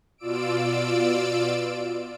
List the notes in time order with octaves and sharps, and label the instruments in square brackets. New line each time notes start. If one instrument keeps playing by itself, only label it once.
[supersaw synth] B2 F4 D5 E6 D7